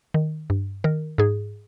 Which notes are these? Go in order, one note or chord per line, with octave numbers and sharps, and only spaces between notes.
D#3
G2
D#3 A#4
G#2 G#4